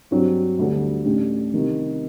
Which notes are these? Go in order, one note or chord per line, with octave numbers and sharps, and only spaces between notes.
G2 F#3 C4
D2 D3 G3 D4
A1 A2 A3 D4 G4
C2 C3 D#3